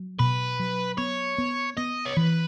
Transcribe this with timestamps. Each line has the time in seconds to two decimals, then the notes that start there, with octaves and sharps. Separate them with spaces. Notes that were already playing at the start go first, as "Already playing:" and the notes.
Already playing: F#3
0.19 B2 B4
0.59 F#3
0.98 B3 C#5
1.38 B3
1.77 B3 D#5
2.06 C#5
2.17 E3 B4